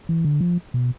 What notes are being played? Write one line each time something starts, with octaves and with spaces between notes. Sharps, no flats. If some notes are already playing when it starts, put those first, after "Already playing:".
E3
D3
F3
B2